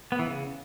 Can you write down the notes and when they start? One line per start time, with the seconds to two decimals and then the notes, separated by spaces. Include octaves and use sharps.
0.12 B3
0.19 E3
0.26 C#3